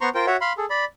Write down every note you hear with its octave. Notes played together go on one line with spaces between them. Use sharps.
B3 C5 A#5 C6 C#6
F4 A#4 C5 G5
F#4 C#5 E5 F#5
F5 B5 C6
G#4 A4
D5 B5